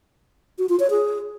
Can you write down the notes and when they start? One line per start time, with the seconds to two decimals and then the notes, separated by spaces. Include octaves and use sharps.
0.58 F#4
0.69 F4
0.80 C#5
0.90 G#4